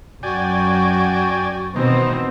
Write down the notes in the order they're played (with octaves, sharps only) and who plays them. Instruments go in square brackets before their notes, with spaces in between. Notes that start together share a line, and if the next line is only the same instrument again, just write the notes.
[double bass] F#2 [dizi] F#4 [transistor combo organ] D5 G5 G#5
[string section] B2 C4 C5 [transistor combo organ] D#3 E3 D#4 [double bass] B3